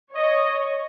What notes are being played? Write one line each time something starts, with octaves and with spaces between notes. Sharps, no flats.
C#5 D#5